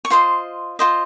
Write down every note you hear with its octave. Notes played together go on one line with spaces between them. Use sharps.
C#6
F4 C5 D#5 C6
F4 C5 D#5